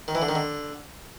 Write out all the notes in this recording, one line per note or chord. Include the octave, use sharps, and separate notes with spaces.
D#3
E3
D3
D#3
D3